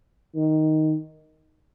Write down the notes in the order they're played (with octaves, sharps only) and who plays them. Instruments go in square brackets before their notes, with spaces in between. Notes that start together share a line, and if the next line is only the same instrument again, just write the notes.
[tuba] D#3